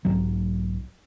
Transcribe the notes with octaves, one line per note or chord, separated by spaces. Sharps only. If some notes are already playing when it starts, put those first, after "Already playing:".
B1 G#2 F#3